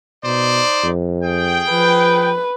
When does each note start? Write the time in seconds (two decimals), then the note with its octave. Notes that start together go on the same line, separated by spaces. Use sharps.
0.24 B2 D#4 C5 D5
0.83 F2
1.23 G#4 G5
1.71 F3 B4